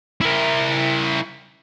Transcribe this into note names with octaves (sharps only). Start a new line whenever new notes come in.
E4 A#4